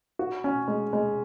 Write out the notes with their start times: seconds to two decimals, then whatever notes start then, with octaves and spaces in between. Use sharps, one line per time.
0.19 F#4
0.44 C#4
0.68 G#3
0.93 G#3